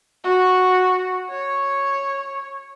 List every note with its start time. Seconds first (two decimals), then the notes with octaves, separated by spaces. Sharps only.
0.24 F#4
1.30 C#5